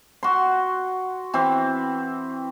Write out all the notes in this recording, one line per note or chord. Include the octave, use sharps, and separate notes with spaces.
F#4 C6
E3 C4